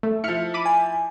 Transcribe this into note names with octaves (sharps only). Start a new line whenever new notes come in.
A3
F3 E4 F6 C#7
B5 D6 D#7
G#5